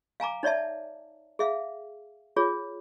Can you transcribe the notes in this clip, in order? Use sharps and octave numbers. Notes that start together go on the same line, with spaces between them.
F5 G#5 A#5 D6
D#4 C#5 D5 E5 A5
G#4 E5 F5
F4 G#4 C#5